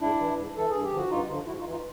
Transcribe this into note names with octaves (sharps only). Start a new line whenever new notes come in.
G#2 D4 E4
E3
G#2
E3 A4
G2 G#4
G4
D3 F3 F#4
G2 D#4 F4
D3 F3
G#2 E4 F#4
D#4 F4
E3
D#4 F4